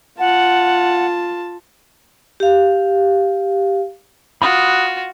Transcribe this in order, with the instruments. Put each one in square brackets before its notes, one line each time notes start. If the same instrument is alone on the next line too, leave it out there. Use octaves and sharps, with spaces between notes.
[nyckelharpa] F4 A5 [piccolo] F#5
[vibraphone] G4 F5
[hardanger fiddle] F4 F#4 [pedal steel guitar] B5 D#6 F#6